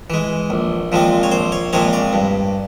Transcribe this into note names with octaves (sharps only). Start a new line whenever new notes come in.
E3 G#3
A#1
A#2 F3 G#3 C4
C#5
A#1 C5
C#5
A#2 F3 G#3 C4 C#5
D5
G2